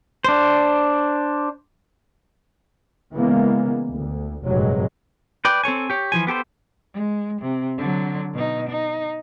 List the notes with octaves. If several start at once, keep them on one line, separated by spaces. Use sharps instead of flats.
D4 C5
C#3 E3 G#3 A#3 B3
D2
F1 G2 A#2 F#3 G#3
B4 D5 G5
C4 A4 C#5 G#5
G4 C#5
E3 F3 G#5
B3 G4 A4 C5
G#3
C3
D3 F#3
B2 D#4
D#4